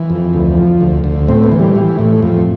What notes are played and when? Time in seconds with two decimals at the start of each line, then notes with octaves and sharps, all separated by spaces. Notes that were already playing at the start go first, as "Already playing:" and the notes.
Already playing: E3
0.10 F2
0.34 D2
0.57 F3
0.81 D2
1.04 D2
1.28 A2 C4
1.44 B3
1.52 E3
1.59 G3
1.75 E3
1.99 A2
2.22 F2